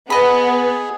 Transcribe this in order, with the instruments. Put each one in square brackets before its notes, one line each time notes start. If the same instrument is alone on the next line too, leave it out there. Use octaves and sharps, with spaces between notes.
[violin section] B3 [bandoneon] G#4 [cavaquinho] D#5 B5